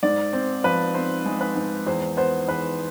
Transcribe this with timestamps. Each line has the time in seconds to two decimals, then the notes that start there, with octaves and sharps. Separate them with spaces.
0.03 G#2 D5
0.33 C4
0.64 F3 B4
0.94 C4 C5
1.26 G#3
1.41 B4
1.56 G#2
1.86 E2 C5
2.17 B3 C5
2.48 E2 B4